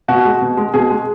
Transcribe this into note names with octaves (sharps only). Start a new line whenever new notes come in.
B2 F#4
G#3
B2
G#3
B2 G#4
G#3